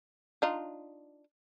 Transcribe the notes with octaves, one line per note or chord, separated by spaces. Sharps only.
D4 D#4 F4